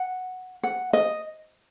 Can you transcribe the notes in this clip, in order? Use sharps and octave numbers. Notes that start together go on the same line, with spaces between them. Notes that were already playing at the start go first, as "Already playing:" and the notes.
Already playing: F#5
F#5
D#5